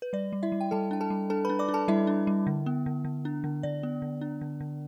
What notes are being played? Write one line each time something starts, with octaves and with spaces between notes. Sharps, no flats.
B4
G3 D5
G3
E4 E5
G3
G5
G3 A4 A5
D4 G5
A4 A5
G3
D4 A4 A5
D4 B4 B5
D5 D6
D4
A4 A5
G3 E4 E5
D4
G3
D3
B3
D3
D3
D4
D3
D3 D5
B3
D3
D4
D3
D3